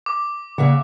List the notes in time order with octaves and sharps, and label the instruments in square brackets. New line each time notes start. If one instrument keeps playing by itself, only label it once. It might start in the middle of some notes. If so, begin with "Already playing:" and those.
[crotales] D6
[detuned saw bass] C#3 [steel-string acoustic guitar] A#3 E5 F#5